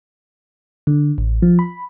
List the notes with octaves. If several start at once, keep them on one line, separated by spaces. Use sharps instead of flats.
D3
A1
F3
B5